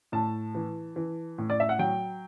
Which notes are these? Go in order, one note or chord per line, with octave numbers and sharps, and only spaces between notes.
A2 A5
E3
E3
A2
D5
E5
F#5
F#3 G5